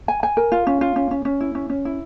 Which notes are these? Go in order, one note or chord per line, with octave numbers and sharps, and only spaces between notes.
G#5
G#5
A#4
F4
C#4
F4
C#4
C#4
C#4
E4
C#4
C#4
E4